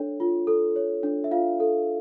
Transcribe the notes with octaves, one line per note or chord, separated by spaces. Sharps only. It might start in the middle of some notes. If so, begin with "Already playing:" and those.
Already playing: D4 A4 C#5
F4
A4
C#5
D4
E5
F4 F5
A4